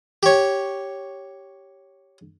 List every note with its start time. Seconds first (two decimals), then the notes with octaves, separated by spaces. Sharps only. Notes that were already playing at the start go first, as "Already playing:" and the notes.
0.23 G4 C#5